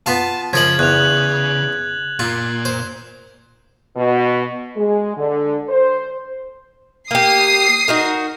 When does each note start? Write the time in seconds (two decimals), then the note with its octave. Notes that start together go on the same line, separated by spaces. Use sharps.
0.06 B3 F4 F5 A5
0.53 C#3 F3 A#4 D#5 G#6 F#7
0.79 E2 F#6 F7
2.19 A#2 F4
2.65 C5
3.95 B2
4.76 G#3
5.16 D3
5.69 C5
7.11 A#3 G4 D#6 C7
7.88 D#4 F#4 A#4